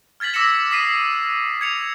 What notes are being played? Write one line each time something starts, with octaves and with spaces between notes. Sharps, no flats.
F6 G#6 A6 B6 F#7
D6 E6 A#6 B6 C#7 E7
D#6 B6 C7 D#7
G#6 C#7 F7